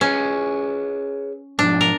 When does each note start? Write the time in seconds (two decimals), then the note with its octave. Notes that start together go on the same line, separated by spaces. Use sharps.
0.01 C#4 G#4 B4 C#5
1.59 G#2 B2 F3 D4
1.81 A#4